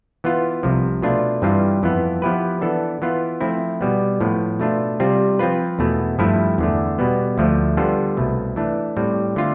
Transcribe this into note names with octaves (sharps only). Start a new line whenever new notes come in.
E3 B3 F4
C2 C3 F3
B2 A3 D4 F4
G2 E3 G3 C4 F4
F2 E3 B3 F4
F3 B3 E4 G4 B4
E3 B3 D4 A4
E3 B3 F4
F3 A3 C4 E4
B2 G3 B3
A2 F3 B3
B2 A3 D4 F4
C3 G3 C4 F4
F3 C4 F4 B4
E2 B2 A3
G2 F3 A3 E4
E2 D3 A3
B2 G3 B3
D2 D3 F3 A3
D3 G3 B3 F4 A4
C2 B2 A3
E3 A3 D4
A2 G3 C4
D3 A3 C4 F4